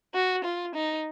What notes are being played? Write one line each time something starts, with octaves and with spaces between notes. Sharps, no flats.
F#4
F4
D#4